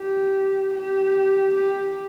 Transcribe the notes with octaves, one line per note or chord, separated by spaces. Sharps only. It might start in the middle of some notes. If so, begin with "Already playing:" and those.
Already playing: G4
G4
G4